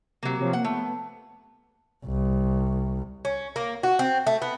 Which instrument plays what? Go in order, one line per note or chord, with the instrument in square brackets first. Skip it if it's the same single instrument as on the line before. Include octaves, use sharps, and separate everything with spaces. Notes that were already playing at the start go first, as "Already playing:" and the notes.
[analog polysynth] C3 [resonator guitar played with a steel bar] F#3 A#3
[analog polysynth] C3 F3 C#5
[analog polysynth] A#3 [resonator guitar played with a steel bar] F#5
[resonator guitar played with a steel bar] A3 [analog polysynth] B3
[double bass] C2
[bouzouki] C#4
A#3
F#4
C4
A3
B3